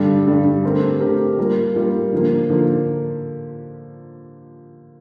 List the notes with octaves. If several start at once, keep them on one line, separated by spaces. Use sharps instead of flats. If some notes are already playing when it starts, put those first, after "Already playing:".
Already playing: G2 D3 G3 D4
G2 D3 G3 D4
D3 A3 C4 G4 A#4
D3 A3 C4 G4 A#4
G3 A#3 F4 A#4
G3 A#3 F4 A#4
D3 F3 A#3
D3 F3 A#3